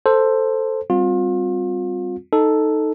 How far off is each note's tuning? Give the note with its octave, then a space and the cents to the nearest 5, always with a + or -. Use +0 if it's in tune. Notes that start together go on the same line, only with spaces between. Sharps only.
A4 +10 C5 +5
G3 +0 C4 +0 F4 +35
D#4 +0 A4 +0